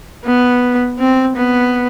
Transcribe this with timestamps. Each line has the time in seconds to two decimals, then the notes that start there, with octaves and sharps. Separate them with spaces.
0.25 B3
0.99 C4
1.36 B3